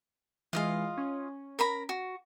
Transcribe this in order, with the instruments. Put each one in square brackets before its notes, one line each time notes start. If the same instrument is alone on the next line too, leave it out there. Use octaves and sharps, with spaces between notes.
[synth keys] E3 G#3 [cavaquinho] F4 D#5 F5
[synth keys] C#4
[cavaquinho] A#4 A#5 B5
F#4